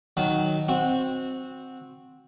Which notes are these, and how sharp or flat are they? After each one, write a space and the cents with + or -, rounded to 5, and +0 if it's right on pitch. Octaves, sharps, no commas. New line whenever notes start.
D#3 +0 F#3 +0 A5 -25
C4 +0 F#4 -15